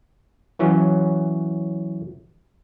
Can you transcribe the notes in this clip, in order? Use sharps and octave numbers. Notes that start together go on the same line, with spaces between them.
E3 F#3 C#4